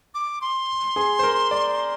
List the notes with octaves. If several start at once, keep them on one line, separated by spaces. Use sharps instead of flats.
D6
C6
G#4
C5
A#4
D5